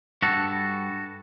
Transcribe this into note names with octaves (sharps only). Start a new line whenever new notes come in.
G2 F#4 A4